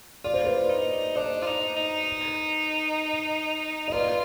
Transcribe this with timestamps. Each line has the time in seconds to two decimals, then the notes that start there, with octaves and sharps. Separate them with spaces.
0.24 F4 D5
0.34 C5
0.44 B4 D5
0.70 D#4
1.16 D4 C5 D#5
1.42 F4
1.46 D#4
1.77 D#4
3.88 D#5
3.92 F4 B4 D5